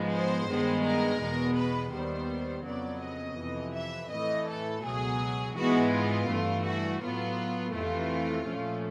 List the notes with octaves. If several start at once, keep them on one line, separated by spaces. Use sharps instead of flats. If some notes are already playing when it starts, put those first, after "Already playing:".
Already playing: G#2 F3 G#3 B3
C5
G2 D#3 G#3 B3
A#4
E2 B2 G#3 B3
B4
D#2 D#3 G3 B3 C5
F2 C#3 F#3 B3 D5
D#5
F2 C3 E3
E5
A2 E3 A3 D#5
A4
C#2 B2 F#3 G#4
G#2 E3 G#3 B3 F#4
F4
G2 E3 A3
F#4
A2 F#3 B3 F4
F2 C3 E3 A3 F4
A#2 F3 A3 C#4